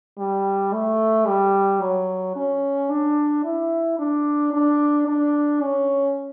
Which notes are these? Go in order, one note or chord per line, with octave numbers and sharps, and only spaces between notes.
G3
A3
G3
F#3
C#4
D4
E4
D4
D4
D4
C#4